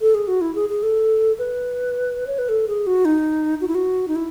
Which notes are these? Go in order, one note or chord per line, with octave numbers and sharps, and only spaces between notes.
A4
G#4
F#4
E4
G#4
G#4
A4
B4
C#5
B4
A4
G#4
F#4
D#4
F#4
E4
F#4
D#4
E4